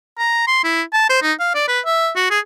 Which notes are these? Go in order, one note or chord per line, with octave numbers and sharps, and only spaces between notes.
A#5
C6
E4
A5
C5
D#4
F5
D5
B4
E5
F#4
G#4